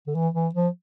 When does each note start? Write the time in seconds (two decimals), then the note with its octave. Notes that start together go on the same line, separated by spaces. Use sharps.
0.07 D3
0.15 E3
0.35 E3
0.55 F3